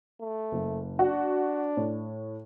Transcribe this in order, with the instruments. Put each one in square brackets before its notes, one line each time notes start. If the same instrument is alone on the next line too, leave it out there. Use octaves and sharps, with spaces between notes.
[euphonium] A3
[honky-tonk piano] F#1
[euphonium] D4 [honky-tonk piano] F#4
[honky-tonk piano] A2